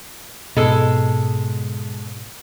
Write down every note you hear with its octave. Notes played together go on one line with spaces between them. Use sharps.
G#2 B2 G#3 A4